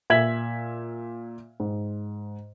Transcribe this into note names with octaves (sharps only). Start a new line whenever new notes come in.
A#2 E5 G#6 B6 F#7
G#2